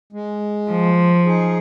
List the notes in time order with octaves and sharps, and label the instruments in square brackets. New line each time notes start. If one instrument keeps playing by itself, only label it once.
[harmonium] G#3
[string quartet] F3
[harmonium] D#4 G#4